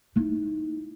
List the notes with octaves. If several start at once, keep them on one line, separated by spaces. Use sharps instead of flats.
D#4 E4